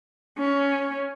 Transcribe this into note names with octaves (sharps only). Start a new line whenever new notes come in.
C#4